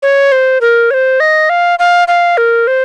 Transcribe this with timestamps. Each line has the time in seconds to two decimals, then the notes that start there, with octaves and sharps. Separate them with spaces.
0.03 C#5
0.32 C5
0.61 A#4
0.91 C#5
0.94 C5
1.20 D#5
1.50 F5
1.79 F5
2.08 F5
2.37 A#4
2.67 C5